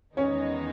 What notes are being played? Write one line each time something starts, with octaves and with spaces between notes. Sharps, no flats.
E2 D#3 G#3 B3 C#4 D#4 C#5